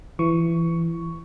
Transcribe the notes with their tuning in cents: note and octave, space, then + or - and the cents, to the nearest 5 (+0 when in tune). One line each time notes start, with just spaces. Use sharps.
E3 +20 C#6 +10